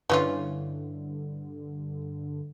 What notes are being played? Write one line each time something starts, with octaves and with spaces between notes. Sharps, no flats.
G2 D3 E3 C#4 F4